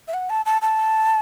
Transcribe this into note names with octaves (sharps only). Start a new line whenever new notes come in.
E5
F#5
A5
A5
A5